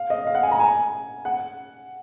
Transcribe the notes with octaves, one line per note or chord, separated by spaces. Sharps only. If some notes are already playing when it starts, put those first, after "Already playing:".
Already playing: F5
D#5
F5
F#5
G#5
A#5
G#5
F#5